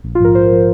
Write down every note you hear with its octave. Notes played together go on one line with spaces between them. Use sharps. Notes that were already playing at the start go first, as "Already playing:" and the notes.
A#1
F4
G#2 F3 A#4
A#1 C5
F3